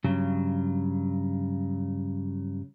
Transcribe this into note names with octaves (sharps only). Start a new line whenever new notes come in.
G2 C#3 F#3